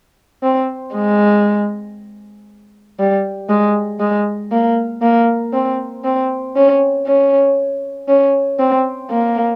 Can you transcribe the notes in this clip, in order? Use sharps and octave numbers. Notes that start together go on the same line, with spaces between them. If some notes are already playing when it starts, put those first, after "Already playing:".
C4
G#3
G3
G#3
G#3
A#3
A#3
C4
C4
C#4
C#4
C#4
C4
A#3